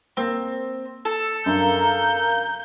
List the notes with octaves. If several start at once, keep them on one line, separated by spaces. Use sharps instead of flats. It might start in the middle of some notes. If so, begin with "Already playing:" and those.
A#3 C4
A4
F#2 D4 A#4 F5 A#5 G6